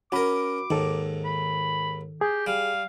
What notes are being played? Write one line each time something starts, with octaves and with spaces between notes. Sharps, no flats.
C#4 F#4 A#4 B5 D6
D#2 G#2 D#3 A4
B5
G4 G#4
G3 F5